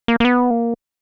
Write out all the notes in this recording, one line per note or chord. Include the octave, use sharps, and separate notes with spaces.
A#3
A#3
B3
A#3